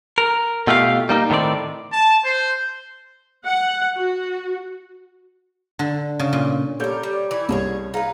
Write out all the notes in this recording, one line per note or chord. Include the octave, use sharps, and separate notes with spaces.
A#4
B2 A3 F4 G4 A#4 F5
G3 A#3 D#4
A2 D#3 C4 D5
A5
C5
F#5
F#4
D3
C#3
A#2
G3 A4 A#4 C#5 G6
G3
E3 E4
C2 G#4 A4 C#5
D#4 G#4 B4 F5 A#5